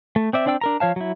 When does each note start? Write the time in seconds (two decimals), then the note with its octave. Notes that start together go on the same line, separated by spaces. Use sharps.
0.16 A3
0.33 C4 D5 E5
0.46 C4 D4 D5 G5 E6
0.61 D4 A#4 A#5
0.80 F3 C#5 F5 A5
0.96 F#3 E4